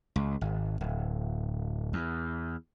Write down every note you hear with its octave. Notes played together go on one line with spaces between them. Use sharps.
C#2
G#1
D1
E2